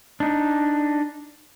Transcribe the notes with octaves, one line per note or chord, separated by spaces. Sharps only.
D4 D#4